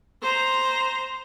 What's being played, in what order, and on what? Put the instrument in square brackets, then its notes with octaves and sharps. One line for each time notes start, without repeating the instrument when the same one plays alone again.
[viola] C5 A#5